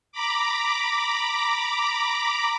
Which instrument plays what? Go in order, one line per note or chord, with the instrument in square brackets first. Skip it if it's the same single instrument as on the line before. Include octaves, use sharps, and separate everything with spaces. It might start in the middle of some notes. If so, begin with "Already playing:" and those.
[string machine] A#5 B5 D6